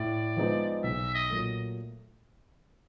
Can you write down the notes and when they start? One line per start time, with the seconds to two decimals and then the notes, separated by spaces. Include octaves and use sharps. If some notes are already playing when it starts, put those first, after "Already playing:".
Already playing: A2 D5
0.37 F3 G#3 B3 D#4
0.83 B1 E5
1.14 D#5
1.30 A#2 F#3 A3